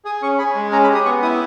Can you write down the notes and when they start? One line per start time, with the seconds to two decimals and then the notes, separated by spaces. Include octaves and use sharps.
0.05 G#4 D#6
0.22 C#4 C#6
0.38 G#4 B5
0.55 G#3
0.72 C#4 A#5
0.84 B5
0.89 G4
0.95 D#6
1.05 B3 C#6
1.22 E4 D#6